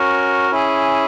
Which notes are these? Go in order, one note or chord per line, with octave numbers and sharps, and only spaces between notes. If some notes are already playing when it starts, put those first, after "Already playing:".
Already playing: C#4 F#4 A#4
C#4 E4 G#4